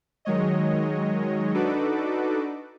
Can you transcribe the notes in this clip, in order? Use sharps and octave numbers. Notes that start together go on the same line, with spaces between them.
D#3 F#3 G#3 C#5 D#5
D4 D#4 F#4 A4 B4 D6